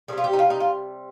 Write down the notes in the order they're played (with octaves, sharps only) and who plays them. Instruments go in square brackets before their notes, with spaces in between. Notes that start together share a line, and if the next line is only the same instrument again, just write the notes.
[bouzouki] D#3 G3 G#4
C3 F4
G4
D#4
F4
D#4
F4